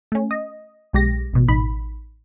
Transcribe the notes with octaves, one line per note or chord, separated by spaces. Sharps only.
A3 C#4
D#5
B1 G#3 G4 A#6
A1 B2
A1 D#4 B5